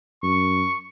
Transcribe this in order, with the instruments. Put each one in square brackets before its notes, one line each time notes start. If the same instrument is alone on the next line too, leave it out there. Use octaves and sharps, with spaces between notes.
[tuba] F#2 [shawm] C#6